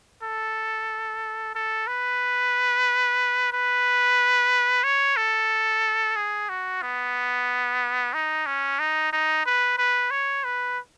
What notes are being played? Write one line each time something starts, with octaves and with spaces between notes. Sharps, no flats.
A4
A4
B4
B4
C#5
A4
G#4
F#4
B3
D#4
C#4
D#4
D#4
B4
B4
C#5
B4